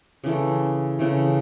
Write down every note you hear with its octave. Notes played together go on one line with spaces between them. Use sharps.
C#3 E3 A3
C#3 E3 A3